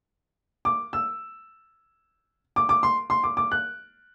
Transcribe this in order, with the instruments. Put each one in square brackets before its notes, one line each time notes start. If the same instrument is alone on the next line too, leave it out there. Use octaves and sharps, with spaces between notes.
[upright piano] D6
E6
D6
D6
C6
C6
D6
D6
F#6